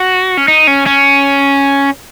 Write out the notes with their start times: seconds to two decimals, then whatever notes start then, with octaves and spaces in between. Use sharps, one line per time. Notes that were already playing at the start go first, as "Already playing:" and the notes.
Already playing: F#4
0.37 C#4
0.48 D#4
0.67 C#4
0.86 C#4